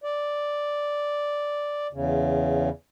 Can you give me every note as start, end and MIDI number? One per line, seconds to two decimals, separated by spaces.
0.04 1.87 74
1.93 2.70 40
1.93 2.70 49